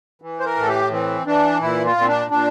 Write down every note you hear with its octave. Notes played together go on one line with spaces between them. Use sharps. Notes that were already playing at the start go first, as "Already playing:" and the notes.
E3
C5
A#4
A2 A4
G4
E3 C4
E3 D4
A#2 E4
F4
A#2
C4
D4
A#2 D4